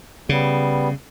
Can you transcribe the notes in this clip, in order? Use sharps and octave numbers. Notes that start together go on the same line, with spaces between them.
C#3 G3 B3